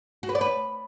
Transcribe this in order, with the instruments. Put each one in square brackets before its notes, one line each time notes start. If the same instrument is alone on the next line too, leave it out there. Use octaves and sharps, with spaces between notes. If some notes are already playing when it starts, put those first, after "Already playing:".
[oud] F#4
B4
D5
B4